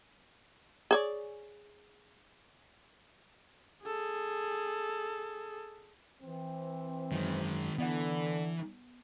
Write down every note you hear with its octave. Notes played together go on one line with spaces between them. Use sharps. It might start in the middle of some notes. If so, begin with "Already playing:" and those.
G#4 C#5 D5
G#4 A4
E3 C4
F#2 D#3 G#3
D3 E3 B3 D5 F#5